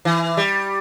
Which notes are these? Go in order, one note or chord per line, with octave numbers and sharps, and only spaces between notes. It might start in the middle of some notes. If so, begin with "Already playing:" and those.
E3
G3